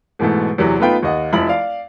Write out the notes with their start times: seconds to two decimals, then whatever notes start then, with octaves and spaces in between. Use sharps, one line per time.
0.19 G#2 B2 E3 G#3 A3
0.58 E2 C3 E3 F#3
0.80 A3 B3 D#4 F4 B4 G5
1.03 D#2 D#5 F#5
1.33 F1 F3 E4 B5 F#7
1.49 D5 F5